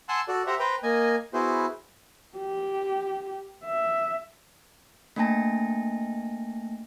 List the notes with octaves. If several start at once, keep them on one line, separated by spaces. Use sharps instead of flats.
F#5 G#5 A5 C6 E6 F#6
F#4 A4 D5
G4 C5 E5 F#5 A#5
B4 C5 G5 A#5
A#3 D#5 G#5
B3 E4 F#4 G#4 C5
G4
E5
A3 A#3 D4 G5 A5 A#6